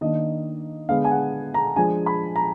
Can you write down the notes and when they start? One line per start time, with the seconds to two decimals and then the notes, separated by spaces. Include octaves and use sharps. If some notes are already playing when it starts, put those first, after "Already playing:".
0.01 D#3 A#3 D4 D#5
0.89 D3 G#3 B3 D4 F5
1.04 G#5
1.11 F#5
1.54 A#5
1.76 F3 G#3 D4 G#5
2.06 B5
2.36 A#5